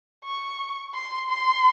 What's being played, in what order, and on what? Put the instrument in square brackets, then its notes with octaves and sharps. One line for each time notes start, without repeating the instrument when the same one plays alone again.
[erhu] C#6
C6
C6